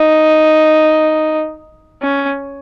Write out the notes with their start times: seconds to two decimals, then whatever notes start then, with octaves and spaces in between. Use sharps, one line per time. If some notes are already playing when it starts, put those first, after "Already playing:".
Already playing: D#4
2.02 C#4